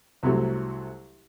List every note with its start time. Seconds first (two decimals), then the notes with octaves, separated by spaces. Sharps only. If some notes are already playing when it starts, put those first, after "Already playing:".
0.23 C2 C3 F#3 A3